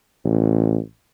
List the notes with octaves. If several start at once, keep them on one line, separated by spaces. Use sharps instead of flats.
A1